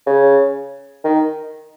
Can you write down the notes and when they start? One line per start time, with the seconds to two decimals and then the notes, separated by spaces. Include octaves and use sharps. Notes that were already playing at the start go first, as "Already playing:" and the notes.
0.07 C#3
1.04 D#3